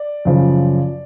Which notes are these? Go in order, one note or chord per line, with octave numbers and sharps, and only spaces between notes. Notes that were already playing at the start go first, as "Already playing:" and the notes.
Already playing: D5
F#2 C#3 F3